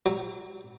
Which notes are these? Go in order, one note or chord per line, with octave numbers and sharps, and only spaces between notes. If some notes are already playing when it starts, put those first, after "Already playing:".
F#3